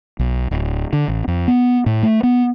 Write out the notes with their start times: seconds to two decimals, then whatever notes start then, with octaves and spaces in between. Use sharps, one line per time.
0.19 B1
0.51 D1
0.93 D3
1.08 A1
1.28 F2
1.48 B3
1.86 A2
2.03 A3
2.23 B3